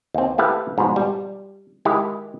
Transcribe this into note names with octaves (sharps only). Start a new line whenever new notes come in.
D#2 C4
A3 E4 G4 B4 F5
G#2 B2 F3
G3
D#3 G#3 E4 G4